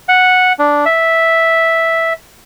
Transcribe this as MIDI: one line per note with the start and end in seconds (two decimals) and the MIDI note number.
0.08 0.53 78
0.59 0.85 62
0.85 2.13 76